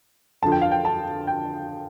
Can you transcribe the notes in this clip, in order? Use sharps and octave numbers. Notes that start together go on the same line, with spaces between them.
F2 D3 F3 A5
G5
F5
G5
A5
G5